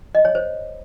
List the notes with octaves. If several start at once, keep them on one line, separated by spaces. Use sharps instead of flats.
D#5
C#5
C5